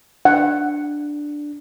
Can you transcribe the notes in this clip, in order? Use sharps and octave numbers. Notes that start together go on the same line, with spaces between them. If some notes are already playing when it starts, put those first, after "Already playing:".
D4 F#5